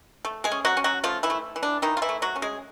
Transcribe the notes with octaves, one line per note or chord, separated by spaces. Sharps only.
A3
G#3 G#4
C#4
F#3 F#4
C#4
F#3 F#4
F3 A3 F4
E3 E4
A3
E3
D4
D#3 E3 D#4
F4
E3 E4
A3
F#3 F#4
C#4
G#3 G#4